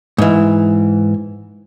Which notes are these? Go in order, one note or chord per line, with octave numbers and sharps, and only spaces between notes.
G#2 E3